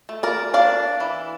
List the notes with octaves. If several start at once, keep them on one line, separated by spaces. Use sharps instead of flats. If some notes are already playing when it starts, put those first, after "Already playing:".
A3
A#4 D5
D4 D5 F5
E3